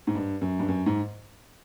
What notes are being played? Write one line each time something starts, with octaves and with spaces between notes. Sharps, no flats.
G#2
G2
F#2
G2
F#2
G#2